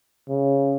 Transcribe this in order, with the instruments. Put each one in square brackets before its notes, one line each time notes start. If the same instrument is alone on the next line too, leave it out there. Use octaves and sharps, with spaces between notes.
[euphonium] C#3